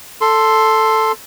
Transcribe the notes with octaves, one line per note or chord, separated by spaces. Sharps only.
A4 C6